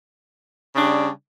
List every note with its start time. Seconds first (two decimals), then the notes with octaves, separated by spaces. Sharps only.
0.72 C#3
0.76 D4
0.79 G3